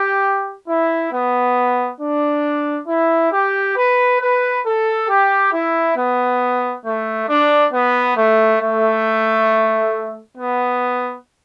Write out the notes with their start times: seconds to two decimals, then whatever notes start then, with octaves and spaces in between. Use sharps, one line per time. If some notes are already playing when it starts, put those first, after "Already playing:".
Already playing: G4
0.68 E4
1.12 B3
1.99 D4
2.88 E4
3.31 G4
3.77 B4
4.19 B4
4.65 A4
5.08 G4
5.53 E4
5.96 B3
6.85 A3
7.29 D4
7.72 B3
8.17 A3
8.60 A3
10.36 B3